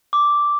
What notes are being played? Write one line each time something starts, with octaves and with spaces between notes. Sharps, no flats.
D6